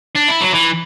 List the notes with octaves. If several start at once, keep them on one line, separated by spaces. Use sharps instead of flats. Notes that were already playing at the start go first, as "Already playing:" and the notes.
D4
E4
F#3
E3